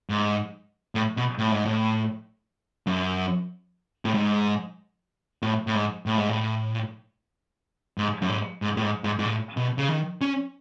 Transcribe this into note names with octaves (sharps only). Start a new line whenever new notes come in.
G#2
A2
B2
A2
G#2
A2
F#2
A2
G#2
A2
A2
G#2
A2
G#2
A2
G#2
F#2
G#2
G#2
A2
G#2
G#2
G#2
A2
B2
C#3
D#3
C#4